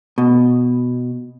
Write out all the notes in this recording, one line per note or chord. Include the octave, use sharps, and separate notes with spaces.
B2